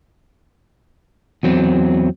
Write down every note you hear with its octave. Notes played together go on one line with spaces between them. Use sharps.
E2 F#3 C4